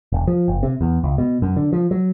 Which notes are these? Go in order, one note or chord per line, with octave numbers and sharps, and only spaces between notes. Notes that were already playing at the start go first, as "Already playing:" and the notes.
E1
F3
F#1
C3
E2
C#2
B2
F#2
D3
F3
F#3